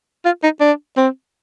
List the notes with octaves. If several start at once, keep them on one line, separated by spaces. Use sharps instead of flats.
F4
D#4
D4
C4